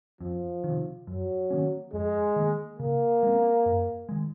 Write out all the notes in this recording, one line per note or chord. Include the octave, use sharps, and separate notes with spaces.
F2 F3
D#3
C3
F#2 F#3
D#3 A#3 C#4
F2 G#3
D#3 A#3
C#3 A#3
G#3 C4
F#2
D#3 G#3